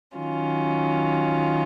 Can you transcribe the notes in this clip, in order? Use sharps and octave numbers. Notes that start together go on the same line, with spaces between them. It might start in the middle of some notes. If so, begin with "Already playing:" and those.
D#3 F#3 C#4 F4